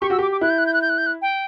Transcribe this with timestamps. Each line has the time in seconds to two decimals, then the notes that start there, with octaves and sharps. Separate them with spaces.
0.02 G4 C#6
0.10 F#4 E6
0.19 G4 D6
0.32 D6
0.41 E4 F#6
0.50 G6
0.58 F#6
0.66 G6
0.74 F#6
0.82 G6
0.89 F#6
0.98 G6
1.06 F#6
1.22 G5